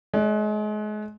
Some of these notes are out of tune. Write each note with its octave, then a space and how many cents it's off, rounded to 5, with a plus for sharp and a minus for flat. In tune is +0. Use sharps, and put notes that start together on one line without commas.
G#3 +35 D5 -10